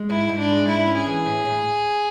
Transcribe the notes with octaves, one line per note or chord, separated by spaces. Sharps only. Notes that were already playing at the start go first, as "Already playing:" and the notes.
Already playing: G#3
G#2 E4
G#2
D4
G#3
G#2 E4
C#4
G#4
E3
A2
A2